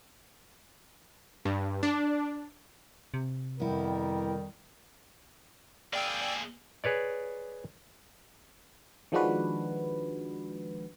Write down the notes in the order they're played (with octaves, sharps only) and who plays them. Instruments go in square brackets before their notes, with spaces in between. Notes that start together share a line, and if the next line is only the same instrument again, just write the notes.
[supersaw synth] G2
D4
[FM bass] C3
[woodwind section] F2 D#3 G3 [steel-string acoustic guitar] B3 E4 [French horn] A#4
[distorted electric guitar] A#3 G#4 [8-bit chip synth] D5 G5 E6
[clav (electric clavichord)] G#4 B4 C#5 D5
[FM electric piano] D#3 F3 G#3 D4 F#4 B4